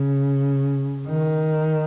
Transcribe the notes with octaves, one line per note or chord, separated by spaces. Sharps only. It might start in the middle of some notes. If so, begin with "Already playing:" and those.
Already playing: C#3
D#3